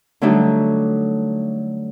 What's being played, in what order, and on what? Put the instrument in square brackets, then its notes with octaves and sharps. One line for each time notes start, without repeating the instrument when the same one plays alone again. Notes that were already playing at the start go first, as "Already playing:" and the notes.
[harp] D3 F#3 G3 A3 D4 D#4